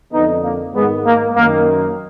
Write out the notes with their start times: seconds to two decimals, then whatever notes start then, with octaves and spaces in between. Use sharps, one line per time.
0.13 F2 D3 B3 D#4
0.43 A#3
0.74 G#2 D#3 G#3 B3
1.05 A#3
1.36 F#2 D#3 A#3